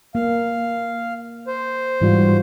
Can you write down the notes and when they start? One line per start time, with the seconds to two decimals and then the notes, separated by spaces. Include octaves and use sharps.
0.15 A#3 F5
1.47 C5
2.01 G#2 E3 G3 F4 F#4